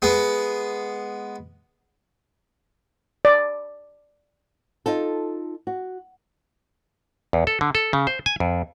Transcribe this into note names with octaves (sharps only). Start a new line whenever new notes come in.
G#3 B3
D5
D#4 F4 A4
F#4
E2
A4
D3
A4
C#3
C5
G#5
F2